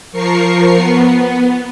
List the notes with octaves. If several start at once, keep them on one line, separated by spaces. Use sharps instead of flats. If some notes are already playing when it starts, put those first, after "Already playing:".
F3 A#4 C#6 C7
B3